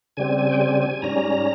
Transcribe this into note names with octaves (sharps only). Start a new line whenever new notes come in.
C#3 G3 C4 G#5
G#5
G5
G#5
G#5
G#2 G3 C#4 A#5